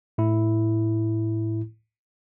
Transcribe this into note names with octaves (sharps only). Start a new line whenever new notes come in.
A2 E4